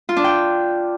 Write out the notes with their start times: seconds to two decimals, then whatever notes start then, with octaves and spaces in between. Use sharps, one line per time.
0.09 F4
0.17 D4
0.24 G5